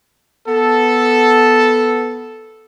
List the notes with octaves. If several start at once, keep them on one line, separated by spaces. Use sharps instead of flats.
B3 A4